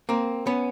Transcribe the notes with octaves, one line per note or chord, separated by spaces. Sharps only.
A#3 C4
B3 C#4